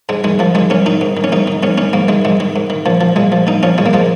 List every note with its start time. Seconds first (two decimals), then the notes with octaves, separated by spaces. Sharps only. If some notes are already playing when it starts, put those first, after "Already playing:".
0.09 G#2 G#3
0.24 D#3 G#3
0.39 G#2 F3
0.55 D#3 G#3
0.70 G#2 C#4
0.86 D#3 D#4
1.01 G#2
1.17 D#3
1.24 C#4
1.32 G#2 D#4
1.48 D#3
1.63 G#2 C#4
1.78 D#3 C#4
1.93 G#2 A#3
2.08 D#3 G#3
2.25 G#2 G#3
2.40 D#3
2.56 G#2
2.70 D#3
2.86 A#2 F3
3.01 F3
3.16 A#2 G#3
3.32 F3
3.47 A#2 D#4
3.63 F3 C#4
3.78 A#2 G#3
3.86 A#3
3.93 F3 G#3